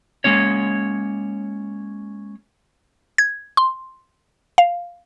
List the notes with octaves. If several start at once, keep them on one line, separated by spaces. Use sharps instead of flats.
G#3 A#3 C#4 C#5
G#6
C6
F5